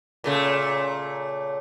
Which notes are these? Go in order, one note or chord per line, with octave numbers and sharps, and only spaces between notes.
A#2 C#3 A3